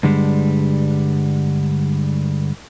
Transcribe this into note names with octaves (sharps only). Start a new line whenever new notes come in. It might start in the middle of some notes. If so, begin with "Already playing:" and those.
G2 D3 G3 G#3